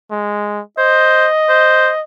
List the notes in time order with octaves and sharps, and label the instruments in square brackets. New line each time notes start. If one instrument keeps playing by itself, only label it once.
[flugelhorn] G#3
[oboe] C5 [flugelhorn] D#5
[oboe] C5